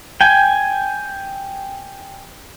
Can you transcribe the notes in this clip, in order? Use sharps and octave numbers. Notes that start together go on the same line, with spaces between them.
G5 G#5